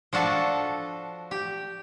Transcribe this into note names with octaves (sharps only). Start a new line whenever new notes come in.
F3 D4 F#4 A4
G4